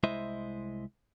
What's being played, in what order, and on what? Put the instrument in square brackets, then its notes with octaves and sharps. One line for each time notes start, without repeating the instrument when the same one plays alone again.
[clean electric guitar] C2 G#3 E4 C5 D#5 E5